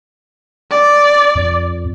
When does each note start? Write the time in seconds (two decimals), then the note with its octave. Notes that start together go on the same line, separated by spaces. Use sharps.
0.71 D5
1.35 F2